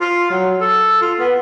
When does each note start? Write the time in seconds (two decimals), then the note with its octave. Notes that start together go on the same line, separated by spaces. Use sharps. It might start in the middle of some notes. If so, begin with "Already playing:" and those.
0.01 F4
0.30 F#3
0.61 A4
1.02 F4
1.19 B3